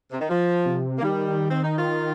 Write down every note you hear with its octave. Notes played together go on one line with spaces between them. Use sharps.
C3
D#3
F3
C3
A#3
D#3 G3
C4
D#4
F4